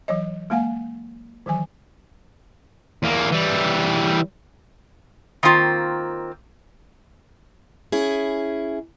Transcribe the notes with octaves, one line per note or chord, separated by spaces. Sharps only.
E3 F#3 C#5 D#5
G#3 A#3 F5 F#5 G#5
D#3 E3 F#3 G#5
E2 A#3
E3 G3
D#3 A#3 C4 F4
C#4 E4 G#4